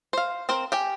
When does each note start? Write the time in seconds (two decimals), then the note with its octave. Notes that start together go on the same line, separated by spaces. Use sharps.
0.13 C5 F5
0.49 C4 A#4 C5
0.72 G4 G5 G#5